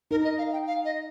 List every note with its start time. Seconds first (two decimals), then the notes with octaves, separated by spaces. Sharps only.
0.11 D#4 A#4
0.24 D#5
0.38 F5
0.53 G5
0.67 F5
0.85 D#5